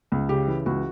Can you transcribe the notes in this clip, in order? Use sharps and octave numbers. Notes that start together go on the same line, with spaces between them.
C#2
C#3 G4
E3
C#2 F#4